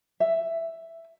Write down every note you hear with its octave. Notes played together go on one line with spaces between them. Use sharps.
E5